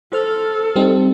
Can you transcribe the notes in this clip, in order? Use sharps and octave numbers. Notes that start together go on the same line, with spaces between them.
A4 C5 F6
G3 C4 D#4